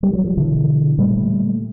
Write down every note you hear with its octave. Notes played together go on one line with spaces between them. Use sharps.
G3
F#3
F3
B2 D3 E3
A#2 G3 A3